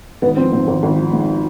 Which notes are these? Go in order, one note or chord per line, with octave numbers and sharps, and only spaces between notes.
G#1 B3
F3 C4
G#2 C4
G#1
G#1
F3
G#2